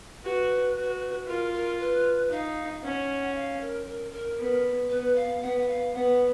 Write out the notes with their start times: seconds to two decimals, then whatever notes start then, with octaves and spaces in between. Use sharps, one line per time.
0.24 F#4 B4
0.76 F#4
1.28 F4 A#4
1.53 A#4
1.80 B4
2.30 D#4 F5
2.83 C#4 F#5
3.35 F5
3.61 A#4
3.86 A#4
4.12 A#4
4.39 B3
4.90 B3 B4
5.16 F5
5.42 B3 F#5
5.59 F#5
5.68 F5
5.94 B3 F#5